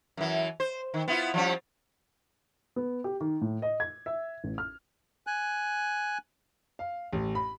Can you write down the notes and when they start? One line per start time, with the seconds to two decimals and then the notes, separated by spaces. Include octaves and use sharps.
0.17 F#2 E3
0.60 C5
0.94 D#3
1.08 B3 E4 F4
1.34 F3 G3 C#4
2.76 B3
3.04 G4
3.21 D#3
3.41 A2
3.62 D#5
3.80 G#6
4.06 E5
4.44 A1
4.58 F6
5.27 G#5 F#6
6.79 F5
7.13 A1
7.35 B5